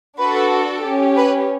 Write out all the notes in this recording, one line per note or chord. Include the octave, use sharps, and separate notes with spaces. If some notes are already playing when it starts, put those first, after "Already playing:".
D4 F#4 A4 B4
C#4 G4
B4